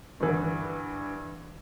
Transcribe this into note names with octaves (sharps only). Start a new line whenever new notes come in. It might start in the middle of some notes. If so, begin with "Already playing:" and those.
G2 D3 E3